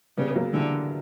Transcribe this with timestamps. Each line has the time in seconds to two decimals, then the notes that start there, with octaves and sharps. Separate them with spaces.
0.17 C#3 G3 B3
0.30 B3
0.35 F#3 A#3
0.53 D3 E3 G3